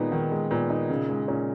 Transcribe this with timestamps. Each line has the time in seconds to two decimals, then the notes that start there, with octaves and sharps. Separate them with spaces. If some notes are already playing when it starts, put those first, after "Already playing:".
Already playing: A#2 D#3 G#3 B3 D#4
0.12 D#3
0.31 G#3
0.51 A#2 B3
0.70 D#4
0.90 C#3
1.09 G#3
1.28 A#2 C#4